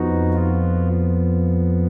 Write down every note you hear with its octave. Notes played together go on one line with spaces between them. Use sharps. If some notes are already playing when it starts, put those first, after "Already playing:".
Already playing: F2 F3 B3 D#4 F#4
F4